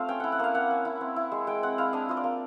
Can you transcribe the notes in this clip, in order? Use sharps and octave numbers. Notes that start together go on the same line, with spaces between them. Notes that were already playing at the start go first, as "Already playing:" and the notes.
Already playing: A3 C4 F4 F5
C#4 G5
E4 F#5
F#5
A#3 F5
A#3 F#5
C#4
E4
C4
E4
G#3
G#3 G5
C4 F#5
E4 F5
D4 D#5
F4 D#5
D5
A#3